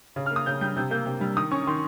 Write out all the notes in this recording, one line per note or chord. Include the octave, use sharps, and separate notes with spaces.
C#3
F6
A#3
D#6
C#3 G6
G3 G6
C3 G6
A#3 G6
C3
G3
D#3 D#6
C#4 C#6
D#3 C6